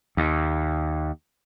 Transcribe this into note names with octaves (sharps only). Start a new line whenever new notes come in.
D#2